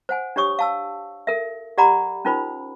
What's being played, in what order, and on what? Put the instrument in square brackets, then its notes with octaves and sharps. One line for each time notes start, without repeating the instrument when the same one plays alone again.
[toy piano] C5 F#5 G#5
D4 G4 C#5 C#6 D#6
F5 A5 E6
A4 A#4 E5
G4 D5 F#5 A#5 B5 D6
C#4 D#4 F4 A#4 C5 B5